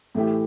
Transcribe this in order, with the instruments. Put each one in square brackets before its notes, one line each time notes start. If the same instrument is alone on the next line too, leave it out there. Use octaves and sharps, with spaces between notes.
[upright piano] A2 E3 A3 E4 G4